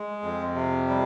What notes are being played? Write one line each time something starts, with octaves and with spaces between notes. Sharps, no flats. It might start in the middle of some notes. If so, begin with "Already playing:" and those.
Already playing: G#3
F2
C3
G3